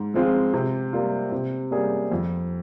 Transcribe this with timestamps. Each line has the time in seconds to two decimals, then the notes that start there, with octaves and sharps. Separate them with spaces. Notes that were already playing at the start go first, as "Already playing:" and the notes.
Already playing: G#2
0.14 F3 G#3 C4 F4
0.54 C3
0.93 G3 A#3 F4
1.32 C3
1.71 G3 A#3 C#4 G#4
2.12 F2